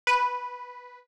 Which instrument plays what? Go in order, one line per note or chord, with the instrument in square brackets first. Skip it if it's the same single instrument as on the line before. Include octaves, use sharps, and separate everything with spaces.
[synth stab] B4